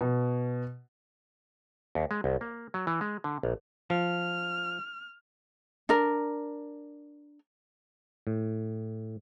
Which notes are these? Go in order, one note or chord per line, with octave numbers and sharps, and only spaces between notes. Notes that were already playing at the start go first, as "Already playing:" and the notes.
B2
D#2
G#3
C2
A#3
F#3
E3
G#3
D3
A#1
F3 F6
D4 A#4
A2